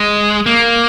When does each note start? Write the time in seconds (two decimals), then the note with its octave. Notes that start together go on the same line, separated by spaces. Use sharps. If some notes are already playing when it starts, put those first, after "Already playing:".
Already playing: G#3
0.46 A#3